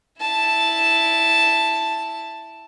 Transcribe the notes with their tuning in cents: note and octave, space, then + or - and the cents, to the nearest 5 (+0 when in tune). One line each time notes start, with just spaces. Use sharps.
E4 +0 A5 +0